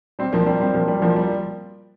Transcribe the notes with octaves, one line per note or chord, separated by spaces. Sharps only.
G3 C4
F3 A#3
G3 C4
G3 C4
F3 A#3
G3
F3 A#3
G3